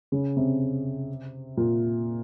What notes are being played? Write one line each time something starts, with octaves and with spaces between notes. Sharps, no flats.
C#3
C3
A#2